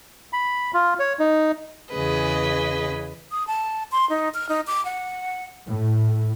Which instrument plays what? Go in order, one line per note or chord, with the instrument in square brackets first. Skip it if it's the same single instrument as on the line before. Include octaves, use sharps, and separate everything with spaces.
[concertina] B5
F4
C#5
D#4
[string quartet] E2 C#3 G#4 B4 D#5
[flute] D#6
A5
C6
D#4
F6
D#4
D6
F#5
[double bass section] A2